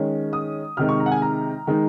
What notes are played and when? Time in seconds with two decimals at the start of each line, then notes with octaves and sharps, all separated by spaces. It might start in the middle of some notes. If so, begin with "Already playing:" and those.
Already playing: D#3 G#3 C#4
0.33 D#6
0.77 C3 D#3 G#3 D#4 F6
0.89 C#6
1.00 A#5
1.06 F#5
1.12 G#5
1.22 A#5
1.67 D#3 G#3 D#4